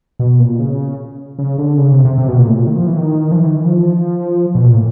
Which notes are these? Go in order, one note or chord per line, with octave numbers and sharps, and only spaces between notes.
B2
A#2
C#3
C#3
D3
C#3
C3
C3
C3
B2
A#2
A2
A#2
D#3
F3
E3
D#3
F3
E3
D#3
E3
F3
B2
A#2
A2